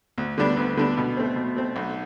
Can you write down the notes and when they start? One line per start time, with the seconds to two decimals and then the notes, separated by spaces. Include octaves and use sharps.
0.18 D2
0.38 D3 G3 B3 D4
0.57 D2
0.77 D3 G3 B3 D4
0.97 B2
1.17 A3 C4
1.36 B2
1.56 A3 C4
1.76 B1